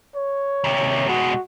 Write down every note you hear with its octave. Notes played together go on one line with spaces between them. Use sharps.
C#5
D#2 C3
B2 G#3 F#4